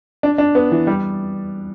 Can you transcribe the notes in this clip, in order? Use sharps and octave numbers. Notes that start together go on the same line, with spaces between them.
D4
D4
B3
E3
G3